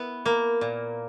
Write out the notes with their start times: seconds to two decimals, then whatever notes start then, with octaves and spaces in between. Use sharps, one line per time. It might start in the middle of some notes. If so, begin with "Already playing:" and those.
Already playing: B3 E4
0.26 A#3
0.61 A#2